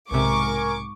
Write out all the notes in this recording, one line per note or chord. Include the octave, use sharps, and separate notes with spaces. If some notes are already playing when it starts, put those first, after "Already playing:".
B1 G#2 C3 A#4 G#5 C#6 D6